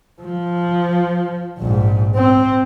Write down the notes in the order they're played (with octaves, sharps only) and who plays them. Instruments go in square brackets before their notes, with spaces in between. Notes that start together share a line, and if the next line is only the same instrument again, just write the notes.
[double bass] F3
A#1 G#2
C4